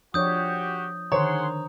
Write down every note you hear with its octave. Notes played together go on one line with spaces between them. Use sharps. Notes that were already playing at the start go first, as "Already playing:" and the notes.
F3 D4 F#4 G4 C#5 D#6 G6
D3 D#3 G#4 C5 C#5 F#5 A#5 C6